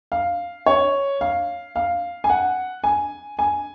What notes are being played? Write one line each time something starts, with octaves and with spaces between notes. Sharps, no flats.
F5
C#5
F5
F5
G#5
F#5
G#5
G#5